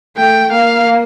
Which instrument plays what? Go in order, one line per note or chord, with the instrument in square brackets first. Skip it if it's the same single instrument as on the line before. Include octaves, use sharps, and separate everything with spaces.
[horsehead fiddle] A3 [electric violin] G5
[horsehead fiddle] A#3 [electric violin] F5